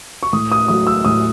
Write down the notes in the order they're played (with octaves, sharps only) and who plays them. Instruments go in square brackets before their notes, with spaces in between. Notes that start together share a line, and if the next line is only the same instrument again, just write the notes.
[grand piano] C#6
A2 D#6
D#6
F#3 A3 D#6
E6
A2 D#6